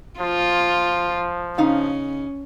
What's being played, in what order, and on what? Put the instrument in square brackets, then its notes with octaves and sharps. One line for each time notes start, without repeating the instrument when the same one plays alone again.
[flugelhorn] F3 [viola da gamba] F4
[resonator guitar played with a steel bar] C#3 D#4 F5 [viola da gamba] C#4